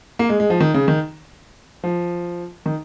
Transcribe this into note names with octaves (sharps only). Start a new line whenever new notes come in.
A#3
G#3
G#3
F3
D#3
C#3
D#3
F3
D#3